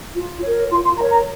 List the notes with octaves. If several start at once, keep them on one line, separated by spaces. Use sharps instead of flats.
F4
A#4 C#5
F4 C6
C6
A#4 C#5 A#5
A#5